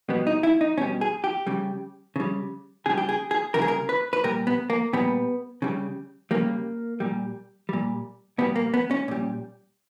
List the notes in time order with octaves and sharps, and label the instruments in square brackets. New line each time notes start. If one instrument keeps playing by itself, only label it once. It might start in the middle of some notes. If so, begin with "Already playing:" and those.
[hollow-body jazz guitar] B2 G3 B3
D#4
E4
D#4
B2 G3 C#4
G#4
G4
C#3 G3
C#3 G3
C#3 G3 G#4
G4
G#4
G#4
C#3 G3 A#4
G#4
A#4
B4
B4
A#2 G3 A#4
B3
A#3
A#2 G3 B3
C#3 G3
C#3 G3 A#3
A#2 G3
A#2 G3
A#2 G3 B3
A#3
B3
C#4
A#2 G3